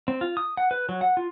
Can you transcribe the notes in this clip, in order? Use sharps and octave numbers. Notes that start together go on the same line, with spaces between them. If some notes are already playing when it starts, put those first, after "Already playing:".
C4
F4
D#6
F#5
B4
F#3
F#5
F4